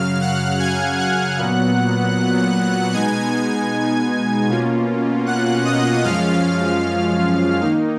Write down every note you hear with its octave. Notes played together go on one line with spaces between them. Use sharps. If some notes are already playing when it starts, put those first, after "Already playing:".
Already playing: F#2 C#3 F#3 F5 F6
F#5 F#6
G#5 G#6
F#5 F#6
A#2 F#3 B3
B2 G#3 B3 D#4 G#5 G#6
B2 A#3 C#4 F4
F#5 F#6
D#5 D#6
F#2 F3 G#3 C#4 F4 F5 F6
D#3 A#3 D#4